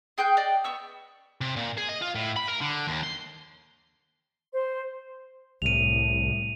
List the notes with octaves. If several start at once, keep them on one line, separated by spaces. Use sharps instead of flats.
G#4 G5 F#6 G6
D5 D#5 G5
B3 C#6 E6
C3
A#2
G#4
D#5
F4
A2
B5
A#4
D3
D#2
C6
C5
C2 A2 D#7 F7